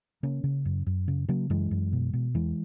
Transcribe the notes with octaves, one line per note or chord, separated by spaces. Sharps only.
C#3 A#3 C#4
C#3
F#2
F#2
C#3
C#3 F#3 A#3
F#2 E3 G#3
F#2
B2
B2
E2 E3 G#3